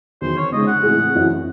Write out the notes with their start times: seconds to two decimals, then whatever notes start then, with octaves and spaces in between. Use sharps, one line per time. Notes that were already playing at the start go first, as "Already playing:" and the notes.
0.21 E2 D#3 F#3 C5
0.37 C#5
0.52 C#3 G#3 D#4 D#5
0.67 F#5
0.83 A2 E3 C4 E4 G#4
1.14 F#2 E3 C4